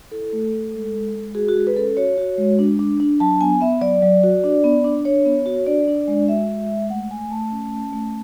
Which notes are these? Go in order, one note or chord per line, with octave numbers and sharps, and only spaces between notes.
E4 A4
A3
A3
G#3
G#3
G#3
F#4 G#4
F#4
G#3 G#4
B4
C#4 A4
F#4 C#5
F#4
G#3
D4
D4
D4
F#3 A5
B3 G#5
B3 E5
F#3 D5
F#3
F#4
D4
B3
D4
D4 C#5
B3
F#4
D4 D5
D4
G#3
F#4 E5
G#3
G#3
A3 F#5
A3 G#5
A3 A5
C#4
C#4
A3